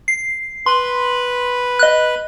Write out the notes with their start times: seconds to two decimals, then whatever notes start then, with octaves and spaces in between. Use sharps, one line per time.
0.08 C7
0.66 B4 B5 C6
1.79 D#5 F#6